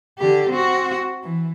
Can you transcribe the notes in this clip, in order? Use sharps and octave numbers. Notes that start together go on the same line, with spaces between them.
D3 G4
C4 F#4
E3